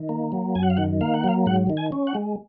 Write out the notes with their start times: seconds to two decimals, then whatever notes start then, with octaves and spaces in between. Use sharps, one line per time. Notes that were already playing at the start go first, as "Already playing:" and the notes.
Already playing: D#3
0.09 A#3
0.32 F#3
0.55 F#2 G#5
0.63 F#5
0.70 F5
0.77 D#3 F#5
1.01 A#3 F5
1.14 F#5
1.24 F#3
1.29 F5
1.46 G#2 F#5
1.70 D#3
1.77 G#5
1.92 C#4
2.07 F#5
2.15 G#3